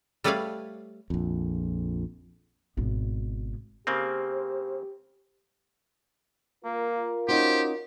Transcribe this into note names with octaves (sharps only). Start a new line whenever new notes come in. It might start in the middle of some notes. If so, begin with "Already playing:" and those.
G3 A3 B4 C#5 D5 F5
A#1 F2
G#1 B2
C#3 A#3 C4 G4 C5
A#3 F4 A#4
C#4 D#4 F#4 G4 C5